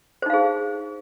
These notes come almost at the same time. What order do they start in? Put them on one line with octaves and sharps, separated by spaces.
C5 D#4 F5 G#4